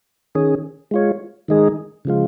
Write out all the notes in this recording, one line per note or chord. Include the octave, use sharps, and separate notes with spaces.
D#3 C#4 G#4
G#3 F4 C#5
D#3 G#3 D#4 G#4
C#3 F3 G#3 F4